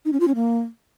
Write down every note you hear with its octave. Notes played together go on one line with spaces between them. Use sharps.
D#4
C#4
F4
C#4
A#3